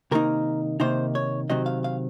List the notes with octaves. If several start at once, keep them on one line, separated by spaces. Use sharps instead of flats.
C3 D#3 A#3 D#4 A#4
C3 D#3 A#3 D#4 C5
C#5
C3 D#3 F#3 C4 D#5
F5
F5